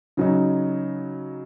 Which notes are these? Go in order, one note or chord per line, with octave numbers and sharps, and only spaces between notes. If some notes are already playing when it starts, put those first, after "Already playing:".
C#3 F#3 D#4